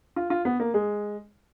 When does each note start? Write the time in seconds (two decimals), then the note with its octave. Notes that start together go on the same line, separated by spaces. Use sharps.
0.16 F4
0.30 F4
0.45 B3
0.60 A#3
0.74 G#3